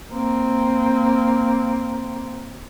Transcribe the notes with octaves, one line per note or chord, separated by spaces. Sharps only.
A#3 C4